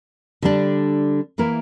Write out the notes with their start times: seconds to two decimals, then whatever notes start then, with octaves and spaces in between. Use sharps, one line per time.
0.42 D3 G3 D4
1.38 E3 A#3 E4 A#4